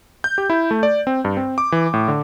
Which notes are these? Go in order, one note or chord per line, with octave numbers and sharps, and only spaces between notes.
G6
G4
E4
A3
D5
C4
G2
C4
D6
E3
A2
D3